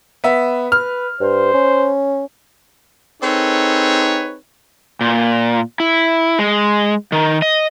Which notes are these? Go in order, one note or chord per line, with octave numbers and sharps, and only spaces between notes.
B3 E5
B4 F6
G2 C5
C#4
C4 D#4 G#4 A4 B4 C#5
A#2
E4
G#3
D#3
D#5